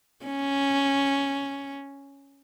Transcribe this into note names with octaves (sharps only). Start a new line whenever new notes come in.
C#4